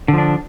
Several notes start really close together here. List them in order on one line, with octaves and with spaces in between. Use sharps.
D3 F3 D4